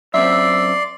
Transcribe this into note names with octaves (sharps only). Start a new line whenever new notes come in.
F#2 C4 D5 E5 C6